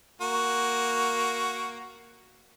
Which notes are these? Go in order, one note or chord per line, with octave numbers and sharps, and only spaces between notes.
A#3 F#4